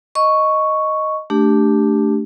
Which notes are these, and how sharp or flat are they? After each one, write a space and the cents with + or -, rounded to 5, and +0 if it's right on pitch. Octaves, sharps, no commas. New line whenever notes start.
D#5 +0 C#6 +0
A3 +0 D4 +0 G4 +0